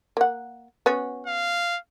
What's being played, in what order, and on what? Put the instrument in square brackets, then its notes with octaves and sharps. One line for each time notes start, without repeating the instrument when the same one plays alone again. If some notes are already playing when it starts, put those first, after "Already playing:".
[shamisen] A#3 F#5
B3 C#4 F#4
[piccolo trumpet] F5